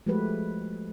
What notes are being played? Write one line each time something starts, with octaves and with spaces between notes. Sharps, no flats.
F3 G#3 A3 F#4 G4 B4